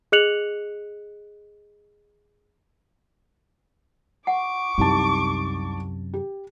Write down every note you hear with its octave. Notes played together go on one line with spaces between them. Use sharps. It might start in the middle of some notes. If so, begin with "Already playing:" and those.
G#4 D#5 F#6 C#7 F7 F#7
F#5 C#6 D6
C2 F#2 C3 D#4 A5
G4